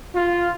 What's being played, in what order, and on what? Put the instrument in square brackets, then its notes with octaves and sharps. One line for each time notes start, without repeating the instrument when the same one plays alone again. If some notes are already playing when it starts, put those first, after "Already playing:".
[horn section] F4